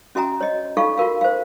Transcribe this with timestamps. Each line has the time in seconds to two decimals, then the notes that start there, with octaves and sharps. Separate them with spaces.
0.15 C#4 F#4 E5 G#5 A#5
0.41 C#5 D#5
0.77 D#4 F4 A4 F5 C#6
0.98 F4 F#4 A#4 F5
1.21 C5 F5